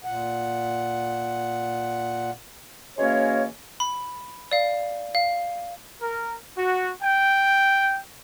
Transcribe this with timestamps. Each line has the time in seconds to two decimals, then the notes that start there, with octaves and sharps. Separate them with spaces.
0.04 A#2 F#5
2.98 E3 G#3 A#3 C#4 F#4 C#5
3.80 B5
4.52 D5 F5
5.15 F5
6.01 A#4
6.57 F#4
7.02 G5